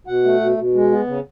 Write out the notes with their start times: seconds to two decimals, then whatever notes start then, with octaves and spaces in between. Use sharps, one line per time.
0.07 B2 F#5
0.24 A3
0.40 B2
0.57 B2
0.74 G#3
0.91 B3
1.07 C#3